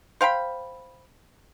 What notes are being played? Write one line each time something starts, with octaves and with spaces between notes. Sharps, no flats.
C5 F5 G5 B5